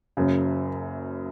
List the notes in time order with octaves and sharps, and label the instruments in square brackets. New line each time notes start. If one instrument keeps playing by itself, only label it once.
[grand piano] F#1 F#2 C#3